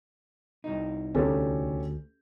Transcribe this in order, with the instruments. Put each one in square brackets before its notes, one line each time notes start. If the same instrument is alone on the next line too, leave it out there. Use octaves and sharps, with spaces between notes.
[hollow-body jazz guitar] C2 D#4
[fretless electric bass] D2 [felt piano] C#4 G4 A4